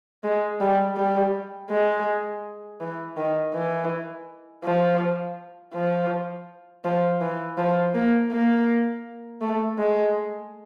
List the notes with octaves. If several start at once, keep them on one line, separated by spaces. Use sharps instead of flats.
G#3
G3
G3
G#3
E3
D#3
E3
F3
F3
F3
E3
F3
A#3
A#3
A3
G#3